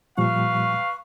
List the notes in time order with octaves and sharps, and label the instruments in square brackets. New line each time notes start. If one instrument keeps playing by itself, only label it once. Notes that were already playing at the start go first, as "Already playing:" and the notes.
[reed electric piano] A#2 F3 G3 [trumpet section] B4 F5 [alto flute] C#6